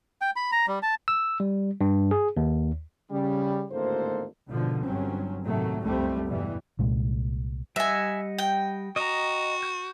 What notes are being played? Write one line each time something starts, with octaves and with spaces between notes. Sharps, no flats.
G5
B5
A#5
G3
A5
E6
G3
G2
G#4
D#2
C#3 G3
G#1 D2 A2 A#3 A4 C5
G#1 B2 D3 F3
G1 G2 F#3 C4 C#4
D#2 A2 C3 D#3 F#3 A3
F#1 C2 F2 G3 A3 C4
E2 G2 B2 E3 G3
C2 A#2 G#3
G3 D#5 E5 F#5 G#5
G5
F#4 D#5 A#5
G6